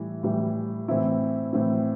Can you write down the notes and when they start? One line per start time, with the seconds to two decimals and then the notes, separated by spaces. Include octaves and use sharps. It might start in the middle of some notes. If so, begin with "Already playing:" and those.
Already playing: A2 E3 G3
0.23 A2 E3 G3
0.88 A2 E3 C4 E4
1.53 A2 E3 C4 E4